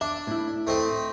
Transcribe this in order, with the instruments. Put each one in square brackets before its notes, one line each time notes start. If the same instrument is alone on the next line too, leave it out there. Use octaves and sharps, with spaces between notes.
[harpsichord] D4 [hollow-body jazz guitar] E5
[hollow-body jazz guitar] A2 E4
[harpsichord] A3 C4 D#5